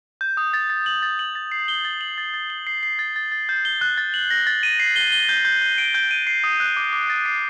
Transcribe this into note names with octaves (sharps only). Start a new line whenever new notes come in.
G6
D#6
A6
A6
F#7
A6
F#7
A6
C7
G7
A6
F#7
A6
A6
G7
C7
C7
A6
A6
A6
G6
G7
F#6
A6
F#7
A#6
A6
D#7
C7
G7
G7
G6
G6
G6
D7
G6
D#7
C7
D#6
F#6
D6
D6
A6
C7